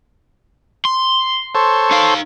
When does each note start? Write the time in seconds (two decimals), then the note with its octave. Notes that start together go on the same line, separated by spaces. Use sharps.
0.85 C6
1.55 A4 C5 C#5
1.91 D#4 F5